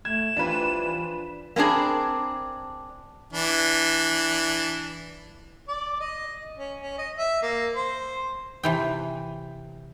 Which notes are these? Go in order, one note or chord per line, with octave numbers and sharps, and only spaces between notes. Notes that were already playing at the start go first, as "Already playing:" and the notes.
A3 G#6 E7
E3 F3 G3 D4 F4 B4
A#3 C4 D4 G#4 A#4
E3 D4
D5
D#5
C#4
C#4
D#5
E5
A#3
C5
C3 E3 G5